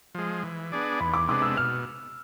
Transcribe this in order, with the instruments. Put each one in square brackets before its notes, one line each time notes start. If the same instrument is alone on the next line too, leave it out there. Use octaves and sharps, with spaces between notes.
[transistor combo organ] F3 G#3
E3
B3 D4 G#4 D5
[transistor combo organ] E2 [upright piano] B5
[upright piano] D6
[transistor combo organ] C3 G#3 B3 D4 [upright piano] D6
[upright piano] E6
[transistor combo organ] B2 [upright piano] F6